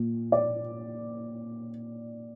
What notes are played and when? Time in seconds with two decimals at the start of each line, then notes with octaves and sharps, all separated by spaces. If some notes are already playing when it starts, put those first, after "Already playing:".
Already playing: A#2
0.32 D5